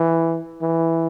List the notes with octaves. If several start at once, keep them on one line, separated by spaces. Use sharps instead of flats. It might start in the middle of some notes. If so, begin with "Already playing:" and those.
Already playing: E3
E3